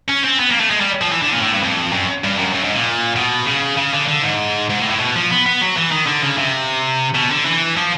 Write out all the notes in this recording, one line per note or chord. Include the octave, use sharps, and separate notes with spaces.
C#4
C4
B3
A#3
A3
G#3
G3
F3
E3
D3
A#2
A2
G2
F2
F#2
G2
F#2
F#2
G#2
A#2
B2
C#3
C#3
D3
D3
G#2
G#2
A2
A2
B2
F3
B3
B3
F#3
E3
D#3
D3
C#3
C3
B2
D3
E3
F3